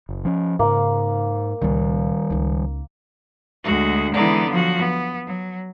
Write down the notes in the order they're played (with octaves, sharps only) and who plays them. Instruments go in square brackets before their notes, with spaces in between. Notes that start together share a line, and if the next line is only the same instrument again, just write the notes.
[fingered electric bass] F#1
F3 C#4
[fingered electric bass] G#2 [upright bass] C#3 [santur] A#3 F5
[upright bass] C#2 A#2 [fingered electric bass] D#3 G3
[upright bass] C#2 D#4
[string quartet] D2 G#3 F#4
D3 E3 G#3 B3 D#4 D5
F3 F#3 F#4
B3
F#3